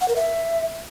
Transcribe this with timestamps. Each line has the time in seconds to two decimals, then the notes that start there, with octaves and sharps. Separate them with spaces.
0.01 F#5
0.08 A#4
0.16 E5